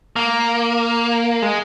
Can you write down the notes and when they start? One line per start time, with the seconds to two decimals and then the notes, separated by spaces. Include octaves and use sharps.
0.16 A#3
1.42 G#3